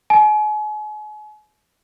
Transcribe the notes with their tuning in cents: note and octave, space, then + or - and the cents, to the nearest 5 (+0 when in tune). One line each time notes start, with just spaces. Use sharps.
G#5 +40